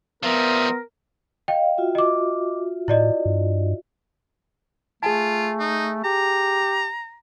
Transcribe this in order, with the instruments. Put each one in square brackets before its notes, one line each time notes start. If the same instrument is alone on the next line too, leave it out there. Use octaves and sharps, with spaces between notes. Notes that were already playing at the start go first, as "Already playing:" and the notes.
[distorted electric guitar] F3 G3 [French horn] B3 [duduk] A#4 [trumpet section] E5 C6 D#6
[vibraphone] D#5 F5 [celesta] G5
[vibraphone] F4 F#4 E5
[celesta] D#5 D6
[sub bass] A2 [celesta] E4 D5 D#5
[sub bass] G2
[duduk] A3 [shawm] F4 [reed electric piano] G#4 G#5 A5
[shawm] D#4
[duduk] G4 [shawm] A#5